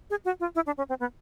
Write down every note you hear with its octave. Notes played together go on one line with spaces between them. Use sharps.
G#4
F#4
F4
E4
D4
C#4
C4
B3